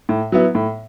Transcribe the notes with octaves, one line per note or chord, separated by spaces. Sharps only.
A2
F#3 B3 E4
A2